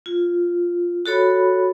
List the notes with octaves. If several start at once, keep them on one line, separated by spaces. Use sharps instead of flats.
F4
F#4 A4 C#5 B5